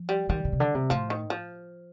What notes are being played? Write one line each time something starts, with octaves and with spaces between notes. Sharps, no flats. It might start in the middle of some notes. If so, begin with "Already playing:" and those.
Already playing: F3
G3
D#3 G3
D3
C3
D3
C3
A2 F3
D#3
F3